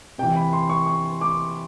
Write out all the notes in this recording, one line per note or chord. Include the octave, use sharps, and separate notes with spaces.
C3 E3 G5
B5
C6
C#6
C#6
D6